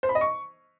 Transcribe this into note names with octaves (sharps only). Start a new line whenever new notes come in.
C5
B5
D#5
C#6